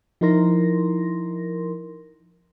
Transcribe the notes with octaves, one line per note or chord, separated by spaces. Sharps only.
F3 D#4 E4 A#4 C6 A#6